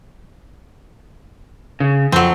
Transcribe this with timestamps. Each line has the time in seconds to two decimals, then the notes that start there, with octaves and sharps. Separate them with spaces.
1.80 C#3
2.12 F2 F#3 C4